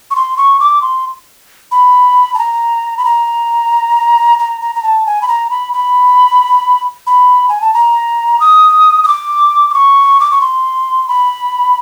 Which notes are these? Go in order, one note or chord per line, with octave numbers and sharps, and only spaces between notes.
C#6
C6
C#6
D6
C6
B5
A5
A#5
B5
A#5
A#5
A#5
A#5
A5
G#5
B5
A#5
B5
B5
B5
G#5
A5
A#5
D#6
D#6
D6
D6
C#6
D6
C#6
C6
B5